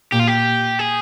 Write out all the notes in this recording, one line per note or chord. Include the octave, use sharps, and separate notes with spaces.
A#2 G4
F4
G4
G#4